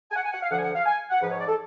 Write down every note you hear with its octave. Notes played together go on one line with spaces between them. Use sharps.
G#5
F#5
G#5
F#5
F5
D2 D3 F3 F#5
G#5
F#5
F5
G#5
F#5
G#2 F3 B4
C#5
D5
A4